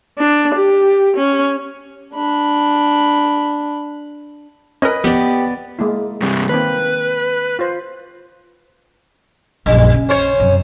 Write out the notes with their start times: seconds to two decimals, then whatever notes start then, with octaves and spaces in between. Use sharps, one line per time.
0.19 D4
0.54 G4
1.16 C#4
2.14 D4 B5
4.82 C#4 A#4 B4 D#5
5.04 B3 G4 D5
5.79 G#3 A#3 E4
6.22 G2 C3 G3
6.49 D#3 A#3 C4 B4
7.59 F4 C5
9.66 A#1 F#2 G3
9.94 C#3
10.09 C#4 C5 C#5
10.40 F#2 C3